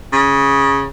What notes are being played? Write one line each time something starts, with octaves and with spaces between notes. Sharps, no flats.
C#3